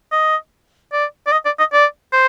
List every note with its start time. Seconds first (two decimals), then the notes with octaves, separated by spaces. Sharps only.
0.12 D#5
0.93 D5
1.26 D5
1.32 D#5
1.45 D5
1.59 D#5
1.73 D5
2.12 C5